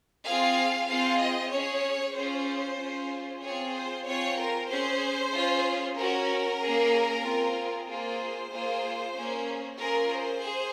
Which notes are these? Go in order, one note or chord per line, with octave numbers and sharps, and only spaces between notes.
C4 F4 G#4 F5
C4 F4 G#4 F5
D#5
C#4 G#4 C#5
C#4 F4 G#4 C5
C#4 F4 G#4
C4 F4 G#4 C#5
C5
C4 F4 G#4 C#5
A#4
C#4 G#4 C5
C#4 F4 G#4
C#4 F#4 A#4
A#3 C#4 G#4
C4 F4 G#4
A#3 F4 G#4 C5
A#3 F4 G#4
A#3 C#4 G#4
C#4 F4 G#4 A#4
C5
G#4